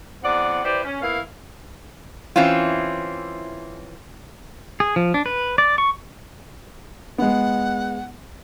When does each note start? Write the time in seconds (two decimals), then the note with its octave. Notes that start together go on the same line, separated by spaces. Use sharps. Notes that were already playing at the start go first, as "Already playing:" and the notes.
0.24 E2 C4 D5 F#5
0.65 E4 G4 B4 C5 D5
0.85 C#4
1.02 A#3 B3 E4 F5
2.36 E3 C4 C#4 E4 F4
4.80 G#4
4.96 F3
5.14 D4
5.26 B4
5.58 D5
5.78 C#6
7.18 G#3 B3 F#5